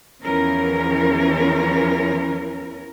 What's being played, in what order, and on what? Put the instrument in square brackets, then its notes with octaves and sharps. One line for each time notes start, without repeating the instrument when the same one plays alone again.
[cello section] E2 E3 F3 C#4 A#4